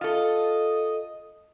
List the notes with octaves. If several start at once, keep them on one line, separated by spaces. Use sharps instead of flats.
F4 A4 D#5